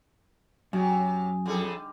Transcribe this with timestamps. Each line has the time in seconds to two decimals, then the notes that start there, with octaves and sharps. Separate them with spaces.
0.73 F#2 C3 F#3 G#4 G5 G#5
1.46 F2 D3 G3 D#4 G#4 A4